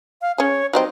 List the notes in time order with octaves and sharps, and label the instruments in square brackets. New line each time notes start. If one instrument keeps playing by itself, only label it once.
[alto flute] F5
[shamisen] C#4 G#4 [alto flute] C#5
[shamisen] F#3 G3 C4 [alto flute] D#4